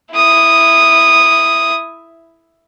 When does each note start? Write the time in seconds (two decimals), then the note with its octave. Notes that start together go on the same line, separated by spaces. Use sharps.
0.13 E4 D#6